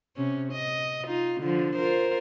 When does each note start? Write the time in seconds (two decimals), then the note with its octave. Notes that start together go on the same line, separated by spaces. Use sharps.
0.17 C3 C#4
0.53 D#5
1.07 D#4 F4
1.41 D3 F3
1.76 F4 A#4 C5